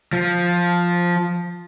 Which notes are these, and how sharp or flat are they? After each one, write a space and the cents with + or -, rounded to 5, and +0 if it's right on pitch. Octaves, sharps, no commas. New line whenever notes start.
F3 +5